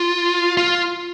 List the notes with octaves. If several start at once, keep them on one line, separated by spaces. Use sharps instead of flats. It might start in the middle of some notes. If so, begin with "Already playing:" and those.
Already playing: F4
F4